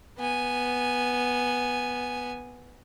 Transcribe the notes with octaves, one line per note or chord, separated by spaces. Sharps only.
B3 G#5